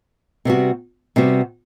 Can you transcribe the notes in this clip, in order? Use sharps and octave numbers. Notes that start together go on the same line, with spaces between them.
C3 G3 B3 F#4
C3 G3 B3 F#4